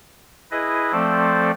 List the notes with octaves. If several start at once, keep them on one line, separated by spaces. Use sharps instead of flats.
E4 G#4 B4 D#5
F3 A3 C4 A4 C5 D5